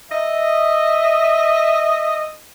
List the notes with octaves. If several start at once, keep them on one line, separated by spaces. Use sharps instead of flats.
D#5 E5